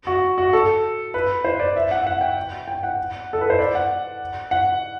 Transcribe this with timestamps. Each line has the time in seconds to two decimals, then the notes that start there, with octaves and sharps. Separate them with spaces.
0.07 F#4
0.38 F#4
0.53 A4
1.14 B4
1.45 C5
1.60 D5
1.76 E5
1.91 F#5
2.07 F#5
2.21 G5
2.68 G5
2.83 F#5
3.33 A4
3.41 B4
3.50 C5
3.59 D5
3.75 F#5
4.51 F#5